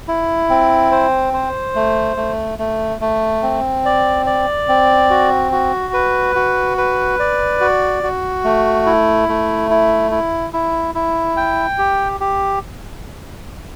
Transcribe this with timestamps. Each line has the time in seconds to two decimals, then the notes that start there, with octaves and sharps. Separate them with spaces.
0.08 E4
0.50 C4
0.92 C5
1.33 C5
1.75 A3
2.17 A3
2.59 A3
3.01 A3
3.43 C4
3.85 D5
4.26 D5
4.69 C4
5.10 F#4
5.52 F#4
5.93 B4
6.35 F#4
6.78 B4
7.19 D5
7.61 F#4
8.03 F#4
8.44 A3
8.86 E4
9.29 A3
9.70 E4
10.11 E4
10.53 E4
10.95 E4
11.37 G5
11.78 G4
12.20 G4